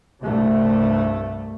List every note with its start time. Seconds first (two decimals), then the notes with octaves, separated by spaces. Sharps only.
0.22 C2 G2 C3 A3